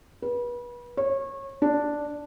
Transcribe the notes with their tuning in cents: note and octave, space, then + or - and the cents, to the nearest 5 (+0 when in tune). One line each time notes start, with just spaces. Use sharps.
B4 -30
C#5 -25
D4 +0